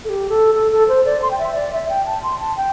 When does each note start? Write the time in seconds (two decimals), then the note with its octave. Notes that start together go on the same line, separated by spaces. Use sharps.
0.04 A4
0.09 G4
0.29 A4
0.55 A4
0.72 A4
0.88 C5
1.05 D5
1.22 C6
1.31 G5
1.39 E5
1.55 D5
1.72 E5
1.89 G5
2.06 A5
2.23 C6
2.40 A5
2.57 G5